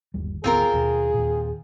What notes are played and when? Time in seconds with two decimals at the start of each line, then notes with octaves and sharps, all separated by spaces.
0.14 G1 D#2 G3
0.44 G#1 D2 B3 C4 F4 G#4 A#4
0.74 D#2 B2
1.14 D#2 A#2